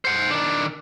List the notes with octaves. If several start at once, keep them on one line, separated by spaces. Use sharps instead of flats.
C5 F#5
D#3 D4